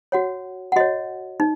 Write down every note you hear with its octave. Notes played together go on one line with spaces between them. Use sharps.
F#4 C#5 F#5
F#5
F#4 C#5 D#5
D#4